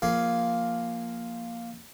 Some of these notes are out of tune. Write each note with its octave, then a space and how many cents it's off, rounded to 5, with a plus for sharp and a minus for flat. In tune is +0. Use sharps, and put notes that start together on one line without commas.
F3 +0 A#3 +0 G#4 +0